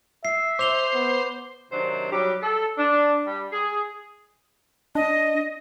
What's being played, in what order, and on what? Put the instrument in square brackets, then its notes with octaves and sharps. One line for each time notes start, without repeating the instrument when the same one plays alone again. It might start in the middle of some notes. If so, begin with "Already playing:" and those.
[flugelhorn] E5 [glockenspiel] C7
[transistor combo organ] C5 [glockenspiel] D6 F7 G7
[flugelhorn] B3
[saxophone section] C3 D#3 F#3 D4 C5
F#3 G3 G4
A4
D4
G3
G#4
[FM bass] D4 [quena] D#5